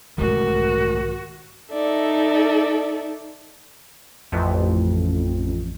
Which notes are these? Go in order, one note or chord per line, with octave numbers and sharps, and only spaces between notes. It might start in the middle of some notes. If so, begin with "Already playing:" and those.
B1 G#2 D#3 G#3 A3 F#4 A#4
D#4 A4 D5 E5
A1 F2